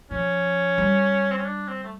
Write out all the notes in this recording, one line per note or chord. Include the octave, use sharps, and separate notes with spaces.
F3 C#4
G3
C4
C#4
D4
C4
A3